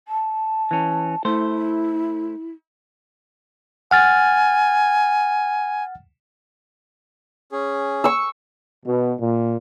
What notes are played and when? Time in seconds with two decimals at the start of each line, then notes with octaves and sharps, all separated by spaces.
0.08 A5
0.71 E3 C#4
1.25 A3 E4 A4 C5
3.91 F#5 G#5 F6 A6
7.52 C#4 G#4
8.04 C#6 E6
8.86 B2
9.20 A#2